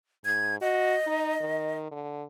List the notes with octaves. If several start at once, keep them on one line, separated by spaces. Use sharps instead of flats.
G#2 G#6
F#4 D#5
D#4
D#3
D3